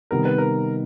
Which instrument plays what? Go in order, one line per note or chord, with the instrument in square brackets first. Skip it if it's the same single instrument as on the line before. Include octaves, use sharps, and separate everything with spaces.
[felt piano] C3 D#3 G3 B3 D#4 [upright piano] A#4
[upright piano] B4
A#4